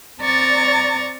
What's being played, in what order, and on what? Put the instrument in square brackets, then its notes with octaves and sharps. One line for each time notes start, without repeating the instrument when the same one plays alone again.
[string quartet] C4 D5 A#5 C#6 A6